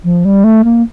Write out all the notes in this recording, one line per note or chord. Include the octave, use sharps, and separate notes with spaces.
F3
G3
A3
A#3